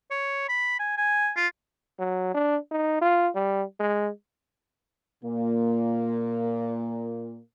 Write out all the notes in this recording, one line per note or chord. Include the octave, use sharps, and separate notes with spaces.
C#5
B5
G#5
G#5
F4
F#3
D4
D#4
F4
G3
G#3
A#2 A#3